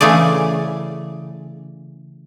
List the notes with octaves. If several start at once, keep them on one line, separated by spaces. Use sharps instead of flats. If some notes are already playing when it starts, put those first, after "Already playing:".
C#3 E3 A3 G#4 D5